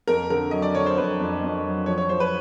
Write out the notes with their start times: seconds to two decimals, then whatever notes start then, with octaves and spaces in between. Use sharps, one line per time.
0.07 F2 A#4
0.30 D3 A#4
0.51 F#3 D#5
0.62 D5
0.75 D3 C#5
0.86 C5
0.97 F2 B4
1.20 F2
1.42 F2
1.65 F#3
1.86 F3 C#5
1.98 C#5
2.09 F3 C5
2.20 B4